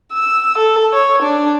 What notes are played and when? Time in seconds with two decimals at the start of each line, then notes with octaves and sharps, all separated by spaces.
0.13 E6
0.58 A4
0.93 C#5
1.22 D4